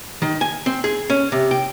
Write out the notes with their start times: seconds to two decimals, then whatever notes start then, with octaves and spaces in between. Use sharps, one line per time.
0.22 D#3
0.41 G#5
0.66 C4
0.84 G#4
1.10 C#4
1.32 C3
1.51 G5